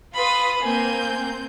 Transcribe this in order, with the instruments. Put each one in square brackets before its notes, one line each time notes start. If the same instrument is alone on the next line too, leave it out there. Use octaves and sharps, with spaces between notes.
[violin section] F4 B4 D#6 [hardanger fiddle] B5 C6
[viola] A#3 [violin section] C4 G6 [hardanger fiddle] G#5